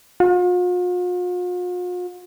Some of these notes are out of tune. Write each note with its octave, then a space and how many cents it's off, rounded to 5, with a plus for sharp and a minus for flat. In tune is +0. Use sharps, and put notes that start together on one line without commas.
F4 +45